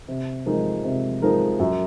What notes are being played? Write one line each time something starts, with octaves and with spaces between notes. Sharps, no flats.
C3
F3 G#3 D#4 A#4
C3
F3 G#3 D#4 A#4
F#2